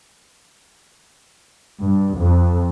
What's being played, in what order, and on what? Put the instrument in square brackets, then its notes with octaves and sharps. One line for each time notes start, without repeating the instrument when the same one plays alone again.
[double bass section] G2
F2